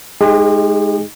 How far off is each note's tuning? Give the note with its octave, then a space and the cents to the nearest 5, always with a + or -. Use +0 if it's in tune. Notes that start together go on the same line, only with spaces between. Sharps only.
G#3 +15 D#4 +0 G4 +45